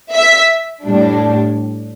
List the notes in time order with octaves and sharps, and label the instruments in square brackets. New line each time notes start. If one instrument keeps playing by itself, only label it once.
[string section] E5
A2 G3 D4